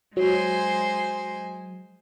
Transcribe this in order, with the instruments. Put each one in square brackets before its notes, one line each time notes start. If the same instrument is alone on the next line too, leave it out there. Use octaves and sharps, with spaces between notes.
[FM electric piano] F#3 [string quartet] G#3 C5 G#5